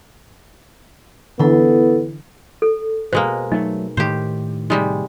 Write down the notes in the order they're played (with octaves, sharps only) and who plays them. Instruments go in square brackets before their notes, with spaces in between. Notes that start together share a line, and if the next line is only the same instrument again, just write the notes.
[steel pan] D3 E3 [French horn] B3 [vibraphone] E4 A4
[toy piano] A4
[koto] B2 G#3 A#3 [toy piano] C5
[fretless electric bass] F#3 A3 [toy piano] D#4
[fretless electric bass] A2 D#3 [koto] G4 C5
[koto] C3 G3 G#3 [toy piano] D#4